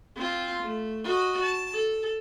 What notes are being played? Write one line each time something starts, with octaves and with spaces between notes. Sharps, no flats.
C4 F4
A3
F#4 D#5
A5
A4